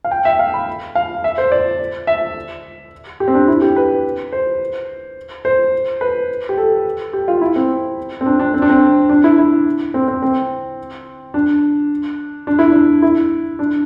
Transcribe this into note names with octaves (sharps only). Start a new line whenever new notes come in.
F5
G5
E5
F5
B5
F5
E5
C5
D5
E5
G4
C4
D4
E4
G4
B4
C5
C5
B4
G4
A4
G4
F4
E4
C4
C4
D4
D4
C4
D4
C4
D4
E4
E4
C4
C4
C4
D4
D4
E4
D4
E4
D4